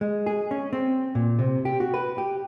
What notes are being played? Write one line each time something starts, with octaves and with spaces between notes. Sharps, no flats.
G#3
G#4
C#4
C4
A#2
C3
G4
F#4
B4
G4